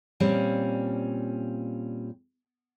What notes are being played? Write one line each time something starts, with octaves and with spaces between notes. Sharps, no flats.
A#2 G3 C4 C#4